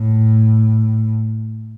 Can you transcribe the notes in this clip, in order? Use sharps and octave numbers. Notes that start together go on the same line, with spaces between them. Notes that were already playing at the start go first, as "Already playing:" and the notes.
Already playing: A2